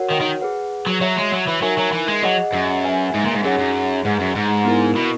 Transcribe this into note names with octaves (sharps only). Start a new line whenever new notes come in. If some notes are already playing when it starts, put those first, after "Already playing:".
Already playing: F#4 A#4 C#5 F#5
D#3
D#3
G#4 B4 F#5
F#3
F#3 F#4 C#5 E5
G#3
F#3
E3
F#3 D#4 A#4 E5 G#5
F#3
E3
G#3
F#3 G#4 D#5 F#5
F#2
G#4 B4 E5 G#5
G#2
A#2
G#2
F#2 D#4 G#4 C#5 F#5
F#2
G#2 G#4 B4 F#5
F#2
G#2
B3 E4 A#4
B2